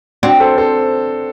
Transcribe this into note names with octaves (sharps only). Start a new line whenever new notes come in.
C4 D4 F#4
A4 C5
A4 C5